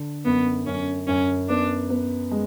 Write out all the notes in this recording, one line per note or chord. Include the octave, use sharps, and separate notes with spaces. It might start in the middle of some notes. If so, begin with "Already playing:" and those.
Already playing: D3
F#2 B3
F#2 C#4
F#2 C#4
B3 D4
B3
G#3